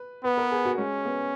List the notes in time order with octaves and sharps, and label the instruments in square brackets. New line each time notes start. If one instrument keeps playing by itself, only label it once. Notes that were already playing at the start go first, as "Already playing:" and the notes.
Already playing: [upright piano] B4
[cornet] B3 [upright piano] B4
[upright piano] A#4
G#4
F#4
[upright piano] G#3 [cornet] C#4
[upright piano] B3